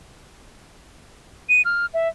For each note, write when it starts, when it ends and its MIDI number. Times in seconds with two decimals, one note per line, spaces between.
1.49 1.62 99
1.65 1.86 89
1.94 2.09 76